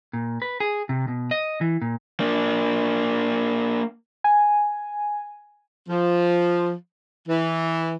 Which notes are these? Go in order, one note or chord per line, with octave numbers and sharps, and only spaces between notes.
A#2
B4
G#4
C3
B2
D#5
E3
A#2
A#3 D4
G#5
F3
E3